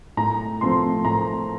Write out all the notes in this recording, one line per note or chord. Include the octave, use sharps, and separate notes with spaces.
A2 A#5
F3 A3 C4 C6
A2 A#5